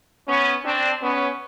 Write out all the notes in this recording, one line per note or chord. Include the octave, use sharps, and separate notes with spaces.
B3 C#4
C4 D4
B3 C#4